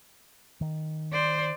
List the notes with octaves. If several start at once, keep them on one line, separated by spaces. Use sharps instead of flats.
D#3
C5 D5